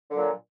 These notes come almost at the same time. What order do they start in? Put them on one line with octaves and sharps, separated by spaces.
D3 F#3 A#2